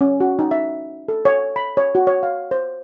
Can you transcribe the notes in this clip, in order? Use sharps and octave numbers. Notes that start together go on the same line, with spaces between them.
C#4
F#4
D#4
E5
A4
C#5
B5
C#5
F#4
C#5
F5
C5